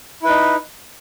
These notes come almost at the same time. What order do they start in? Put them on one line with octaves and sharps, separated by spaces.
E4 B4 D#4